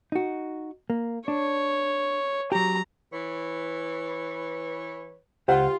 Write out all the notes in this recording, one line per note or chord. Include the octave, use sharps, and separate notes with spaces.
D#4 F#4
A#3
D4 C#5
F#3 G4 A#5
E3 B4 C#5
C#2 F4 G4 C5 F#5